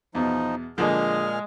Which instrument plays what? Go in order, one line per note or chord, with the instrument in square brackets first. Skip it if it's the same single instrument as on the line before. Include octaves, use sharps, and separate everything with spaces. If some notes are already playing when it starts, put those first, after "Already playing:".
[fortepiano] E2 B2 [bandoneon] F3 D#4
[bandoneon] A#2 G#4 F6 [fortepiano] D3 F3 A#3 [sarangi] G#3